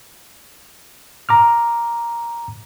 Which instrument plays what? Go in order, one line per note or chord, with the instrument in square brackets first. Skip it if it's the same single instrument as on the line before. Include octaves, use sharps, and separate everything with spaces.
[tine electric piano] A#5 D6 F6